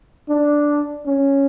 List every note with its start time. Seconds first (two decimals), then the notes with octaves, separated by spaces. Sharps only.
0.29 D4
1.06 C#4